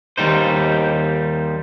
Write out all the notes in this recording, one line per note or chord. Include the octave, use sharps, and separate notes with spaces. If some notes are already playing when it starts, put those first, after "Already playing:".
D#2 G3 D#4 C5